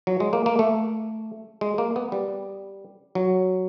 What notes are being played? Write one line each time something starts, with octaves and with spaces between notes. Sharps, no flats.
F#3
G#3
A#3
A#3
A3
G#3
A#3
B3
G3
F#3